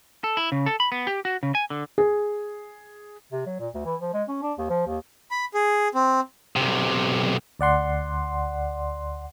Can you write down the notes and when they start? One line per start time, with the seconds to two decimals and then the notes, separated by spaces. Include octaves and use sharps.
0.24 A4
0.37 E4
0.52 C#3
0.66 A4
0.80 B5
0.92 B3
1.07 G4
1.25 F#4
1.43 C#3
1.55 G#5
1.70 D3
1.98 G#4
3.32 C3
3.46 F#3
3.60 A#2
3.74 D2
3.86 E3
4.01 F3
4.14 G#3
4.28 C#4
4.43 D4
4.58 D#2
4.70 F3
4.87 D#2
5.31 B5
5.54 G#4
5.95 C4
6.56 B1 C3
7.59 D2 D5 F#5 C6